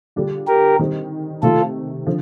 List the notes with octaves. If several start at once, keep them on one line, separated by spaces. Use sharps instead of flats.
D3 G3 D4 F4
G4 A#4
D#3 G3 C4 D#4
C3 D#3 A3 F4 A4
D3 F3